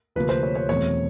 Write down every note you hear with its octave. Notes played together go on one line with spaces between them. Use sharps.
D2 C3 F3 A#3 B4
C5
C#5
C#5
E2 B2 F#3 A3 C4 C#5